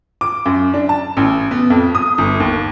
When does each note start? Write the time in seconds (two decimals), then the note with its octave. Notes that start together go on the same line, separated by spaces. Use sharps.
0.21 D6
0.46 F#2
0.74 D4
0.89 A5
1.17 A1
1.51 B3
1.70 F2
1.95 D#6
2.18 G1
2.40 D#2